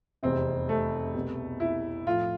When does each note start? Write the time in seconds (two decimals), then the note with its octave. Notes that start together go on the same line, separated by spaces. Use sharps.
0.23 F1 E2 C3 C4
0.69 A3
1.14 C2 B2 B3
1.60 E4
2.06 A2 F3 A3 F4